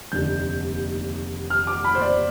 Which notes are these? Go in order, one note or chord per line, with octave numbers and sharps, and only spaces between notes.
F1 D#2 D3 G6
F6
D6
B5
C5
D5